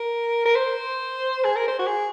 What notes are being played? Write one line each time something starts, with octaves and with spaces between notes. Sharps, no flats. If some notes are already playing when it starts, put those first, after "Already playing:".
Already playing: A#4
A#4
C5
G#4
A#4
C5
F#4
G#4